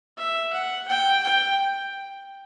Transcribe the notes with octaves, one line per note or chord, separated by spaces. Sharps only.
E5
F#5
G5
G5